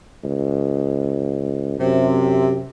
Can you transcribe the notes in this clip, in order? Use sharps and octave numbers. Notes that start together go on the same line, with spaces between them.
C#2
F#2 C3